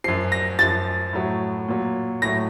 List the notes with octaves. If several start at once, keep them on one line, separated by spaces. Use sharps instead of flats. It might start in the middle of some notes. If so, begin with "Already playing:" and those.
F#2 F3 C7
A#6
F#2 F3 A6
A2 F#3
A#2 F#3
A2 F#3 A#6